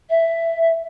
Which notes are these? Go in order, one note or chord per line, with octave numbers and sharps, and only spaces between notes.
E5